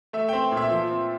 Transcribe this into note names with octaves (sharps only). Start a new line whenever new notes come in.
A3 E5
C4 G5
A#2
E5
F3
C4